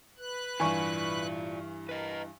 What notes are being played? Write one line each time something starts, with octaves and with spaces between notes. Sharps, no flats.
B4 F#6
G2 E3 F4 D5 G#5 C#6
A#4 B4 D#5